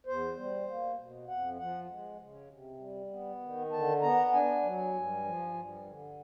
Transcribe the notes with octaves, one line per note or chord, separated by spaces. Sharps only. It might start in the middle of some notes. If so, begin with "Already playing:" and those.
E2 C5
G3
A#3
B2
F2 F#5
F3 F#5
G#3
C#3
C3
G3
B3
D#3
D3 A5
B3 A#5
D4 G#5
F#3
G2
F3
G2
D3